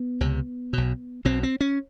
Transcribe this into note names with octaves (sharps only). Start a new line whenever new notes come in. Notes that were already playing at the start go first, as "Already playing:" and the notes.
Already playing: B3
C#2 C3
B1 B2
B1 B2 C4
C4
C#4